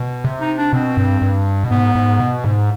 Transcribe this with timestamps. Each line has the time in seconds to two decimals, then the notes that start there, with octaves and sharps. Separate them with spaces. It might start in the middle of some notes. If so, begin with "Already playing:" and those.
Already playing: B2
0.24 C3
0.41 D#4
0.58 D4
0.73 B2 C4
0.97 G2
1.22 G2
1.64 B2
1.71 G#2 B3
1.95 G#2
2.20 B2
2.44 G#2